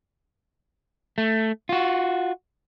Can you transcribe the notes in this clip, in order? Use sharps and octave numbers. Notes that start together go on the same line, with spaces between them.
A3
F4 F#4